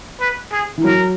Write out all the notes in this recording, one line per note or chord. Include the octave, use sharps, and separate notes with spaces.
B4
G#4
E3
F#3 A#4